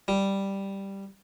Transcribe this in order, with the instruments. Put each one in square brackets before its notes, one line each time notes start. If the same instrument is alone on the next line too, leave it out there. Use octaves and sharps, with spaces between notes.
[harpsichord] G3